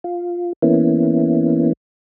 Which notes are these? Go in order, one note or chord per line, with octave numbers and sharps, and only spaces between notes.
F4
E3 A#3 B3 C#4 E4